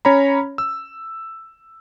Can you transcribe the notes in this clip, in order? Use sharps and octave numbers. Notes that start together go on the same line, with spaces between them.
C#4 C#5 A#5 B5
E6